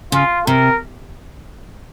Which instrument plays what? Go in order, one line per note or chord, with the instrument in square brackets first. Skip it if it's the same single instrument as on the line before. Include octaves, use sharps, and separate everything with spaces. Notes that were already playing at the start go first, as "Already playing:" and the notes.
[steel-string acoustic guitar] C#3 [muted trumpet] F4
[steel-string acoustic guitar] C3 [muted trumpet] A#4